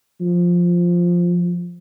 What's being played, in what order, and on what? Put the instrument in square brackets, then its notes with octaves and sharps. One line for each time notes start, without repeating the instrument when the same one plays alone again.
[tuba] F3